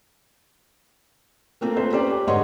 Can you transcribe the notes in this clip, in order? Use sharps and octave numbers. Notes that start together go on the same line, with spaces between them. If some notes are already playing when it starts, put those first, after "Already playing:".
A3 A#3 C4 F4
A3 C4 B4 C5
C#4 G4 C5 D5
G4 B4
G#2 D3 C#5 D#5 F#5 C6